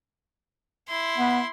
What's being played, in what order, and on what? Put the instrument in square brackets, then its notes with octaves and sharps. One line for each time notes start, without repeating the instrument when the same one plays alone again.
[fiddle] E4 C6
[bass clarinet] B3